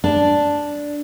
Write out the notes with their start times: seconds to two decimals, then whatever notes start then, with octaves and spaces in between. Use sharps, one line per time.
0.04 D4